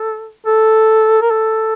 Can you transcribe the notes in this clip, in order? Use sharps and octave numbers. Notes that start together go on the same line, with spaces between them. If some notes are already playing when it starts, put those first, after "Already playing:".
Already playing: A4
A4
A#4
A4